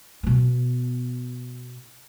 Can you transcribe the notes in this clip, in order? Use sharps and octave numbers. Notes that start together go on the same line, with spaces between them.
B2 B3